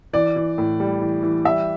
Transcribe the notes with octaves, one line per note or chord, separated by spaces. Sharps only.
E3 D5
E3
A2
G3
E3
E3
G3 E5